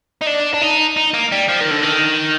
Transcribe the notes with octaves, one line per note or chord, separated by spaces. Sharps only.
D#4
D4
D4
D#4
D#4
A#3
G3
F3
D#3
D3
D#3